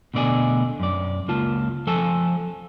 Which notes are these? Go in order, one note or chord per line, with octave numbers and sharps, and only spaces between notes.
D2 B2 D3 D5 D#5 G#5
F#2 D5
C#2 A#3 F4 A5
F3 A4 G#5 A5